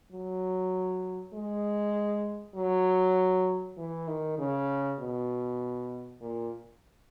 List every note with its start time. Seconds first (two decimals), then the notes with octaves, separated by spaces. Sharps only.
0.12 F#3
1.33 G#3
2.56 F#3
3.78 E3
4.08 D#3
4.38 C#3
4.99 B2
6.21 A#2